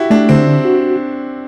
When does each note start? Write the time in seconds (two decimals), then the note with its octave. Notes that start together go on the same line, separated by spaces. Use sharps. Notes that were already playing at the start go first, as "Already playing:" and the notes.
Already playing: E4 F#4 G4
0.10 A3 D4
0.29 D3 C4
0.47 D4
0.65 F#4